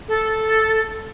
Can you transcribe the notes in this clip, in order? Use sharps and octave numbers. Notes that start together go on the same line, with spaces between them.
A4